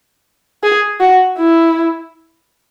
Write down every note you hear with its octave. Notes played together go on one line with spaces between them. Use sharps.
G#4
F#4
E4